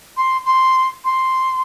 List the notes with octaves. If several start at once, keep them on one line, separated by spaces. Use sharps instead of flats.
C6
C6
C6